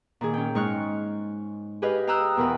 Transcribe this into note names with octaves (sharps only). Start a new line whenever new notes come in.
A#2 D#3 G#4
C#4 G5
G#2 G#3 C#6 F6 F#6
G4 G#4 B4 D#5 F5
F5 G5 A#5 D#6 E6 F#6
E2 B2 A#4 B4